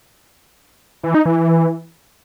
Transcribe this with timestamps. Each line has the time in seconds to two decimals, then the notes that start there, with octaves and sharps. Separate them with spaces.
1.03 E3
1.15 D#4
1.26 E3